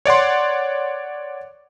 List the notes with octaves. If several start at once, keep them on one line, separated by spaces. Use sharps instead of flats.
C#5 D5 F#5 C6